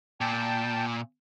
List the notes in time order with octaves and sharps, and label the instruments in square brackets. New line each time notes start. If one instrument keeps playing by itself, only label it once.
[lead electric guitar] A#2 [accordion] G5 A5